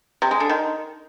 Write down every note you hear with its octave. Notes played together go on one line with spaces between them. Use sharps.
C3
G#3
D3
D#3